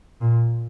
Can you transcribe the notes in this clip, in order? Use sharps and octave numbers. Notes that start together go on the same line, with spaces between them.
A#2